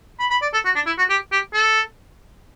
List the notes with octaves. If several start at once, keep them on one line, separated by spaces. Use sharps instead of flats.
B5
B5
D5
A4
F#4
D4
E4
F#4
G4
G4
A4